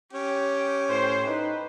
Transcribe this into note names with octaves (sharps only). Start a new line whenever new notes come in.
C#4 G4
A2 C5
D#4 B4